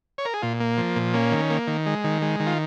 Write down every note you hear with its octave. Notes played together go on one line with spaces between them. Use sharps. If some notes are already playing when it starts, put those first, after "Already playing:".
C#5
A#4
G#4
A#2 F4
A#3
F3
A#2
A#3 C#4
D#3
A#3
D#3
G#3
D#3
G#3
D#3
F4